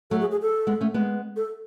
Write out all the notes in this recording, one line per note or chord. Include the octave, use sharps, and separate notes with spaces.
F#3 A3 A4
G#4
G#4
A4
G#3 B3
A3 C#4
G#3 B3
A4